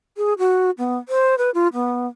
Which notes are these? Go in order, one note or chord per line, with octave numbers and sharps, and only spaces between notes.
G#4
F#4
B3
C5
B4
F4
B3